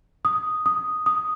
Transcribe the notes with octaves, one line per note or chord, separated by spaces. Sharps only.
D#6
D#6
D#6